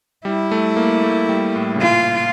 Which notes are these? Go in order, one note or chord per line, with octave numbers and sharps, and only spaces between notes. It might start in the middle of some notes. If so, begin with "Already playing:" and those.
G3 E4
A3
A#3
A3
G3
A2
C#3
A#2 F4